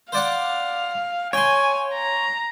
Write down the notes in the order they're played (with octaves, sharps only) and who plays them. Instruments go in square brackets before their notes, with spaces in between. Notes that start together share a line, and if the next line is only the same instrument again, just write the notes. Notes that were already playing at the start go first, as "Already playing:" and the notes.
[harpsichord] C5 D5 F#5 [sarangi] F5
[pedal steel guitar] C#5 [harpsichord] G5 C6 [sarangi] G#5
[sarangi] A#5